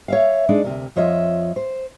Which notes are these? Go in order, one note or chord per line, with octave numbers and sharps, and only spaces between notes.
C#5 E5 F5
G#3 D4 D#4
D2 C3 A#4
F2 F3 F4 C#5 D#5 E5
C5